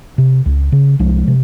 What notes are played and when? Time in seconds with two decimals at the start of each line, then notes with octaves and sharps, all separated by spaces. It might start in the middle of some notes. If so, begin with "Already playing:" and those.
0.18 C3
0.46 C#2
0.72 C#3
0.99 C2 F3 G#3
1.27 C3